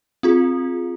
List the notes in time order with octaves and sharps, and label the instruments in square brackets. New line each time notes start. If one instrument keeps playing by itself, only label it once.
[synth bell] C4 F4 G#4